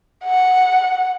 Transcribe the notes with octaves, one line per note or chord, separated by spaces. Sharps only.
F#5